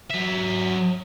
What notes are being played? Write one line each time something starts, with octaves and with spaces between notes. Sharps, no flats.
F#3 E5